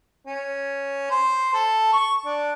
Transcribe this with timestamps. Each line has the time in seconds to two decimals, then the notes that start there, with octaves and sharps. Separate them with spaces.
0.27 C#4
1.10 C5
1.54 A4
1.93 C#6
2.26 D4